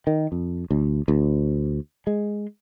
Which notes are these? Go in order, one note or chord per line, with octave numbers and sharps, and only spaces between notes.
D#3
F2
D2
D2
G#3